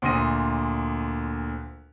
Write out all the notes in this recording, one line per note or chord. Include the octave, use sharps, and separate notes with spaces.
D2 A#2 C6 D#6 A#6 D#7